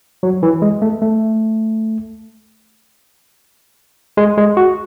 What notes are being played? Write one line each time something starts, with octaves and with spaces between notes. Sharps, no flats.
F#3
E3
G#3
A3
A3
G#3
G#3
F#4